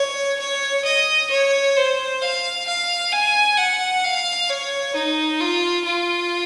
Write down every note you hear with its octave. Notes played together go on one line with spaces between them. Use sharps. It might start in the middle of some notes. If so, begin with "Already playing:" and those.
Already playing: C#5
C#5
D#5
C#5
C5
F5
F5
G#5
F#5
F5
C#5
D#4
F4
F4